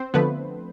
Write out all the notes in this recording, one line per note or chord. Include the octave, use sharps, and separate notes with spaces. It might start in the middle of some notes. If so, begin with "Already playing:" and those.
Already playing: C4 C5
D3 F3 A3 B3 B4